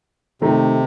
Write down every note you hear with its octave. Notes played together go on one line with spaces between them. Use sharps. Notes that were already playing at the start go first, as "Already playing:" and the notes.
C3 D#3 A3 A#5